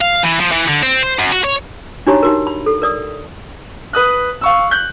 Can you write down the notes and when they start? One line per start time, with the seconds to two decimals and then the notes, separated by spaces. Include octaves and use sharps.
0.01 F5
0.23 E3
0.40 F3
0.52 E3
0.68 D3
0.83 C4
1.03 C5
1.19 F#2
1.33 F#4
1.44 C#5
2.07 D4 D#4 F#4 G4 C#5 A#5
2.23 D#4 F#4 A#4
2.47 B5
2.66 A4
2.82 A#4 D5 D#6
3.93 B4 D#6 F#6
4.41 F5 C#6 E6
4.71 F#6 G6